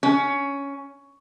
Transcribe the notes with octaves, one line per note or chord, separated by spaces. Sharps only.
C#4